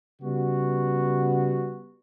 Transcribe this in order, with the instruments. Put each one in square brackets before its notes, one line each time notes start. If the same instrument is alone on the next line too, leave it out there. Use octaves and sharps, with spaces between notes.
[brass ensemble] C#3 G3 B3 F#4